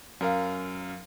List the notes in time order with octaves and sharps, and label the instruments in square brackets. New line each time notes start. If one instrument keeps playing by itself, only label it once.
[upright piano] F#2 A#4 F5